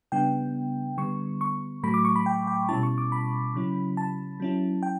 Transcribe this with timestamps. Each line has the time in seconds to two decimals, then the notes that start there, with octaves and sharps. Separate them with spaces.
0.12 C#3 G3 B3 D4 G5
0.98 D3 G3 B3 C#6
1.41 C#6
1.83 A2 F#3 A3 B5
1.94 D6
2.05 C#6
2.16 B5
2.26 G5
2.47 G5
2.69 B2 G3 C#4 E4 A5
2.83 C#6
2.98 D6
3.12 B5
3.54 C#3 F#3 C#4 E4
3.97 A5
4.40 F#3 C#4 E4
4.83 G5